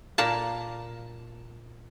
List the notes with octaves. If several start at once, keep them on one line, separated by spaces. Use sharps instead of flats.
A#2 A#3 A5